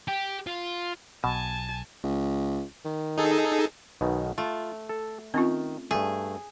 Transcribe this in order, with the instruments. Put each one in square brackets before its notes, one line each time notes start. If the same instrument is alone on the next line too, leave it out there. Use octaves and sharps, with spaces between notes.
[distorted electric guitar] G4
F4
[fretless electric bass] B1 [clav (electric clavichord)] B2 [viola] G#5 A5
[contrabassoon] C#2
D#3
[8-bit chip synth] D#4 G#4 A4
[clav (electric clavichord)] B1 B2 D#3
[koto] A3 [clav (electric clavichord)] F4
[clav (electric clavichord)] A4
[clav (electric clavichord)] D#3 [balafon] C4 C#4 F4
[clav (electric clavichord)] G2 A3 [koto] G#4